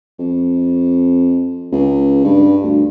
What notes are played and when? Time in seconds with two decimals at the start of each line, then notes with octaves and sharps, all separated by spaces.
0.19 F2
1.72 C#2
2.24 G2
2.63 D2